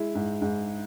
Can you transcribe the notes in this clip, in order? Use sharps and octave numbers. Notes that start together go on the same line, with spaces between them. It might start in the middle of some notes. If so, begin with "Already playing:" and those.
Already playing: G#3 E4
G#2
G#2